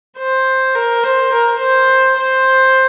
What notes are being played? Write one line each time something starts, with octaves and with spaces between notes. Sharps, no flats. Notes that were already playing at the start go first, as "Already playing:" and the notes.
C5
A#4
C5
A#4
C5
C5